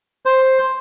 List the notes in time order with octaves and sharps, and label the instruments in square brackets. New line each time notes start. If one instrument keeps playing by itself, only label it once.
[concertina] C5